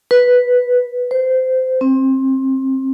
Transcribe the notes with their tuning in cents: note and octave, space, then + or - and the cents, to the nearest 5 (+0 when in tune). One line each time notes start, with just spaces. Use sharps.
B4 -5
C5 -20
C4 +25